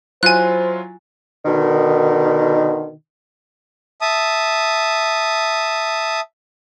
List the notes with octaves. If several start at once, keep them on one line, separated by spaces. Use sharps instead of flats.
F#3 E4 F4 C5 G#5 F#6
B2 D3 D#3
E5 A5 D#6